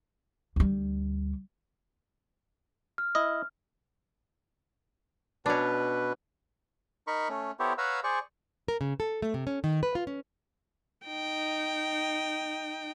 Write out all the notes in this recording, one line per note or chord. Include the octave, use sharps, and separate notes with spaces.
D2 G3
F6
E4 D#5
B2 C#4 D4 B4
D#4 A#4 B5 C#6
A3 C#4
B3 E4 G4 A4 C5 C#5
B4 C#5 F5 F#5 A#5 E6
G#4 C5 D5 C#6
A#4
C#3
A4
A3
C3
C#4
D#3
B4
F4
C#4
D#4 G5